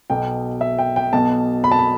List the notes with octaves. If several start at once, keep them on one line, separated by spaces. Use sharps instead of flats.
B1 B2 G5
E5
G5
G5
B1 B2 A5
B5
A5
B5